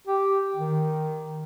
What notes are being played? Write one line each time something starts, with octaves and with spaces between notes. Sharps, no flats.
G4
D#3